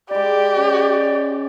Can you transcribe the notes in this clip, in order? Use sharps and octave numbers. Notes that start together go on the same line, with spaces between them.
G#3 G4 D5 B5
C#4